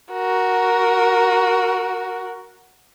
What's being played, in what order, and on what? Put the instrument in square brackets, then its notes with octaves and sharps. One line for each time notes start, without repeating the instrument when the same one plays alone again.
[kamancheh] F#4 A#4